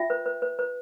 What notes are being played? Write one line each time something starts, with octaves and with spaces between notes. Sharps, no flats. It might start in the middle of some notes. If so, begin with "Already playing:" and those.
Already playing: F4 E5 G5
B4
B4
B4
B4